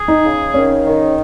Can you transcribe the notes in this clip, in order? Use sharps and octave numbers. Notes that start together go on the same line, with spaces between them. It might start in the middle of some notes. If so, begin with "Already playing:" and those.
Already playing: G#4
D#4
C#3
D#3 C#4
D#3